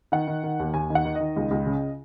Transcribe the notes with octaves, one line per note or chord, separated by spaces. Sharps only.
D#3 F#5
D#3
D#3
D#2
D#2 G#5
D#3
F#5
D#3
D#5
D#3
C#2
C#2
C#3